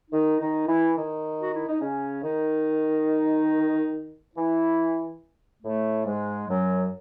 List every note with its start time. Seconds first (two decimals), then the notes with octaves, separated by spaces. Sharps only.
0.11 D#3 D#4
0.40 D#3 D#4
0.67 E3 E4
0.96 D#3 D#4
1.42 F#4
1.55 E4
1.68 D#4
1.81 C#3 C#4
2.23 D#3 D#4
4.36 E3 E4
5.63 A2 A3
6.06 G#2 G#3
6.48 F#2 F#3